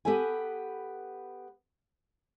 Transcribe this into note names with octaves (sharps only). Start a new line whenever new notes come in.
B3 G4 A4 B4 G#5